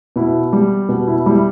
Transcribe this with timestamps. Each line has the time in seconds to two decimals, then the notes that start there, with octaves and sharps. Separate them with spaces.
0.16 B2 E4
0.53 G3
0.89 B2
1.07 E4
1.26 G3 E4